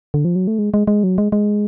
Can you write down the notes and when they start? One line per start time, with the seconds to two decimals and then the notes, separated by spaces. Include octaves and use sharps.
0.14 D3
0.25 F3
0.36 F#3
0.47 A3
0.59 G#3
0.74 G#3
0.87 G#3
1.04 F#3
1.18 G#3
1.32 G#3